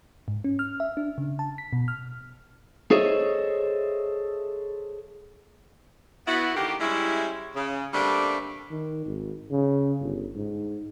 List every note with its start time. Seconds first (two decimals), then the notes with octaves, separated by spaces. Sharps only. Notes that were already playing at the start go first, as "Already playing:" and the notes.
0.28 G#2
0.44 C#4
0.59 F6
0.80 E5
0.97 D4
1.18 C#3
1.39 A5
1.58 B6
1.73 B2
1.88 F6
2.91 G#4 A4 C5 C#5 D#5 E5
6.26 B3 E4 F#4
6.55 D3 D#3 A#3 G4
6.80 G3 G#3 C#4 E4
7.55 C#3
7.93 D3 G3 A3 A#3 C4 D4
8.71 D#3
9.06 G#1
9.51 C#3
10.02 G1
10.35 G#2